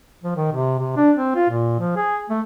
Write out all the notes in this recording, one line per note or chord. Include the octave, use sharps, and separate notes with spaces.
F3
D#3
C3
C3
D4
C4
F4
A#2
F3
G#4
A3